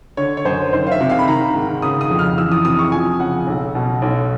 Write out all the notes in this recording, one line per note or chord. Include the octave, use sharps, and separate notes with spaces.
D3 C#5
C#5
F#2 C5
D#3 C5
F5
E5
C3
F5
B5
D#3 A#5
G#2
C#3 D#6
D#6
F2
F6
E3 E6
D#6
C3 D#6
C#6
F3 G#5
C#3 F#5
B1
B2
B1